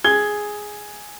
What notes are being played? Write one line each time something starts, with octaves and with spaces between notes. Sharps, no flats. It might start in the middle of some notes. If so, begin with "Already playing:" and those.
G#4 G#6 G7